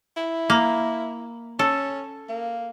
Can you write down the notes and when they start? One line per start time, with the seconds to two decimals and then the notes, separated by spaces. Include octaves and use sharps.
0.17 E4
0.50 A#3
1.59 C#4 A4
2.29 A#3